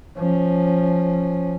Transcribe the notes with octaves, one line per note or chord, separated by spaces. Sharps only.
F3 C#4